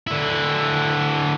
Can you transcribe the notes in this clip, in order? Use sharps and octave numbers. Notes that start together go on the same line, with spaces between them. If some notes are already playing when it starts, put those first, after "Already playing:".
D3 E4